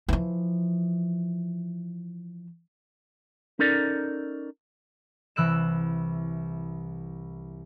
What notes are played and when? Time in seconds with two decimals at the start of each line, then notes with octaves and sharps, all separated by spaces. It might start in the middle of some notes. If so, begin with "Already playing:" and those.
0.08 E3 F3
3.59 C#4 D#4 A4 A#4 D5
5.36 C2 E3 E6 F#6 D7 E7